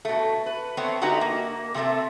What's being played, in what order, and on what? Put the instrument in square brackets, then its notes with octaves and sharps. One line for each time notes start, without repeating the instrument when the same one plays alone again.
[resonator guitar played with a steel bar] B2 A3
B4
A3 B3 C4 C#5
D3 G#3 A3 D#4 F#4 G4
A#3
C3 G#3 A3 C4 E5